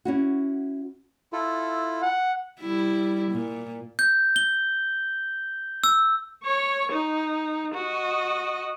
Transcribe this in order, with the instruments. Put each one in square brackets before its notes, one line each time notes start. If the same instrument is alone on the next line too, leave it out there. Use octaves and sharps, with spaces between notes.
[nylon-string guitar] C#4 E4 F#4
[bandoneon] E4 F4 A4
[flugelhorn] F#5
[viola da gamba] G3 E4
A#2
[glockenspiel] G6
G7
E6
[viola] C#5 C#6
D#4
F#4 D#5